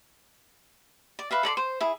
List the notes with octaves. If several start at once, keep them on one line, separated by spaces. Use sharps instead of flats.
D5
B4 E5 F5
A4 D5 B5 C6
C5
E4 G#4